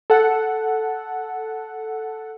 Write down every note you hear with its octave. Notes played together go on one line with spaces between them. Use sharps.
A4 F#5